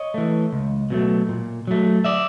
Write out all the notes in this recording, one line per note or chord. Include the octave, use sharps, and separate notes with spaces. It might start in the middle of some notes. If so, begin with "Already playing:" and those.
Already playing: C#5 D#5
E3 A3
C#2
B2 F#3 A3
A#2
F#3 A3
D5 E5